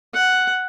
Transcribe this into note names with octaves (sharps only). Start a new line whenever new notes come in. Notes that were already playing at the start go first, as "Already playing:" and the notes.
F#5